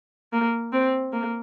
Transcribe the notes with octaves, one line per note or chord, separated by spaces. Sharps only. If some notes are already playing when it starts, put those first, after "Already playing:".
A#3
C4
A#3